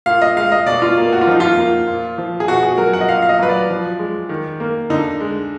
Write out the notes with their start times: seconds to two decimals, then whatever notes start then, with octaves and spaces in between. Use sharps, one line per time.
0.06 A#2 F5
0.22 D#5
0.36 G#3 F5
0.52 D#5
0.66 B2 D5
0.82 F4
0.97 A#3
1.13 F#4
1.21 F4
1.27 F3 D#4
1.40 F4
1.57 A#3
1.87 A#2
2.18 F3
2.40 G#4
2.48 B2 F#4
2.63 G#4
2.78 F#3 A#4
2.93 F#5
3.01 D#5
3.09 A#2 F5
3.22 F5
3.29 D#5
3.39 F#3 B4
3.49 D5
3.70 F3
3.99 G#3
4.29 D#3
4.60 A#3
4.90 D3 D#4
5.20 G#3